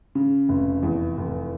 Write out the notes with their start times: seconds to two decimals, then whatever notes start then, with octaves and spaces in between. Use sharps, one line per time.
0.15 C#3
0.49 F1
0.83 E2
1.17 F1